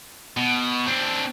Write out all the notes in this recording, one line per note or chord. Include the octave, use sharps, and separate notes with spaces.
B2
C4 D4